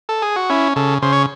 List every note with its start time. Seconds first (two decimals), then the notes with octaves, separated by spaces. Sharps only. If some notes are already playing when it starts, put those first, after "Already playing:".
0.09 A4
0.22 G#4
0.36 F#4
0.50 C#4 E4
0.76 C#3 A4
1.02 C#3 C5
1.13 C#5